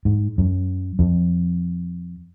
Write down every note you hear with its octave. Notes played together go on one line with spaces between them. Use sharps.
G#2
F#2
F2